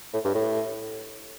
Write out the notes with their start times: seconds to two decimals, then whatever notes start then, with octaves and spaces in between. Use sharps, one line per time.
0.14 A2
0.25 G2
0.35 A2